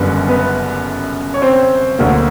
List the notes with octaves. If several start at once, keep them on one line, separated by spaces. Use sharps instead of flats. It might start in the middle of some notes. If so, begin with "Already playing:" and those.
Already playing: F#1 F#2 D3 G3 B3 B4
B3 B4
C#5
C4 C5
D2 D3 F#3 A#3